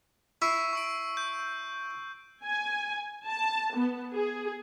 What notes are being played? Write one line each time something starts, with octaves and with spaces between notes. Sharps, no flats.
E4 C#6 C7
C#6 E6 D7
G6
G#5
A5
B3
G#4